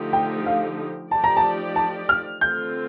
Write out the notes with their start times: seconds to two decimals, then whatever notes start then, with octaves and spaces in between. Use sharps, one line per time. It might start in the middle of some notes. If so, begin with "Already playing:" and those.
Already playing: D3 F3 A3 D#4 G4
0.13 G5
0.46 F5
1.11 F3 A3 D#4 G4 D5 A5
1.24 A#5
1.37 A5
1.76 A5
2.09 F6
2.41 D3 A3 C4 F4 A4 G6